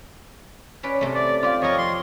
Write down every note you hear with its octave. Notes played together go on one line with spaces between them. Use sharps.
C#4 B4 D5
C3 A3
D5
F4 G4 D5
F2 A#4 C#5 D#5
C6